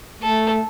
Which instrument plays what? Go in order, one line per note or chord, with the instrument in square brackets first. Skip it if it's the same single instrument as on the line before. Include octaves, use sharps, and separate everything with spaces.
[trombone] A3 [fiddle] A4